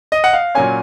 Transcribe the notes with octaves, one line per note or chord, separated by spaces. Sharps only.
D#5
F#5
F5
A#2 F#3 A#3 C#4 G#5